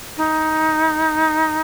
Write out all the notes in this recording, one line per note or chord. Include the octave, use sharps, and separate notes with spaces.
D#4